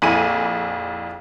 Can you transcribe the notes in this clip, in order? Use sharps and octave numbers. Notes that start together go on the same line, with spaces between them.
A#1 F2 E4 G#5 D#7